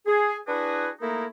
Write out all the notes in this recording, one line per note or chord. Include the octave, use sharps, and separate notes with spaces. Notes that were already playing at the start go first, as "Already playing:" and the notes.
G#4
D4 E4 F#4 G#4 B4
A3 A#3 D#4 E4 A#4